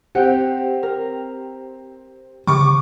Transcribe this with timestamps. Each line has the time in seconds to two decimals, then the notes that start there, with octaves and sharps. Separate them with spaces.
0.15 C4 G4 F#5 G5
0.83 A#4
2.47 C#3 C#6 D6